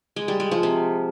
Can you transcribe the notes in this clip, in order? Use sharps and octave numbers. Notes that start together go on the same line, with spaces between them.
G#3
G3
G#3
F3
C3